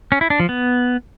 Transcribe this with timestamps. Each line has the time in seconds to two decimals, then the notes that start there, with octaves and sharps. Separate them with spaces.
0.12 C#4
0.21 E4
0.30 D4
0.40 F3
0.49 B3